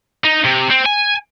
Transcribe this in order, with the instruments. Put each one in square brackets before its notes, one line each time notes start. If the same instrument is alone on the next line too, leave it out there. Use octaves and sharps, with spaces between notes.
[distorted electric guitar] D#4
C3
C4
G#5